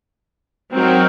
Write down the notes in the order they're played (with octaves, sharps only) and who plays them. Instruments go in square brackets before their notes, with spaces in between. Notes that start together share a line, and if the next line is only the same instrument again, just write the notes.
[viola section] F#3 C4 D#4 A#4